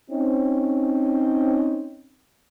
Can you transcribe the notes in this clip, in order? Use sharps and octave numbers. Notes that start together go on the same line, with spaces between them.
C4 C#4 D#4